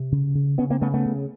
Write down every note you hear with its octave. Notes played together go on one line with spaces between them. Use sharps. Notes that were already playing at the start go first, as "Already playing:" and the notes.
Already playing: C3
C#3
C#3
C#3 B3 C#4
A#3 C4
C#3 A3 B3
A3 B3
C#3